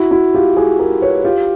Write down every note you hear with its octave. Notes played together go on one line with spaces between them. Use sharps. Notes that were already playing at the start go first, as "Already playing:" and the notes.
Already playing: E4 F#4
E4 F#4
F4 G4
F#4 G#4
G#4 A#4
B4 C#5
F4 G4